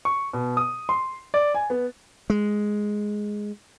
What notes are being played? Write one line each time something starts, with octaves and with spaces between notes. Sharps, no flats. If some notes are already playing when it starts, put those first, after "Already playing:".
C#6
B2
D#6
C6
D5
G#5
B3
G#3